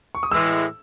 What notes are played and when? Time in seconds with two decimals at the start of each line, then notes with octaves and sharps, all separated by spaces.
0.15 C#6
0.23 D#6
0.32 A2 E3 G#3 E6